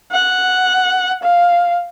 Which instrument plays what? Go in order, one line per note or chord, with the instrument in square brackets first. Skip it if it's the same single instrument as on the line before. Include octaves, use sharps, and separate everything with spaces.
[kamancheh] F#5
F5